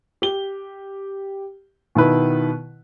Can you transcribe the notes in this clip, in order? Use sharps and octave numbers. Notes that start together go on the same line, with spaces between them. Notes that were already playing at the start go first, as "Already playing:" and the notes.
G4 G7
B2 D#3 E4 B4